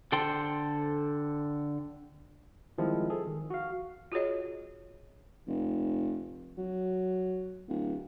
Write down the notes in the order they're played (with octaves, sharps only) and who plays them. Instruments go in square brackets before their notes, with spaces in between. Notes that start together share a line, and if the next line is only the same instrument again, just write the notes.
[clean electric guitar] D3 A4 C5 G5 C6
[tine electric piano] D#3 F3 G3 G#3 C4 E4
G#4 A4
D#3
F#4 F5
[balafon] F4 F#4 G#4 C#5 D#5
[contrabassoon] F1
F#3
D1